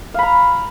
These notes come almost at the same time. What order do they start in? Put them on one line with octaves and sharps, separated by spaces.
F5 B5 A#5